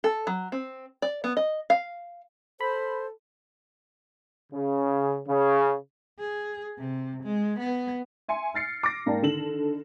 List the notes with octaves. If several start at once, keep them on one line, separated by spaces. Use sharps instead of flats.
A4
F#3
C4
D5
B3
D#5
F5
A4 C5 B5
C#3
C#3
G#4
C3
G#3
B3
E5 G#5 C6 C#7
F6 A6 C7 C#7
D6 A#6
G#2 A#3 D5 G5 A5
D3 D#3 A4 E7 F#7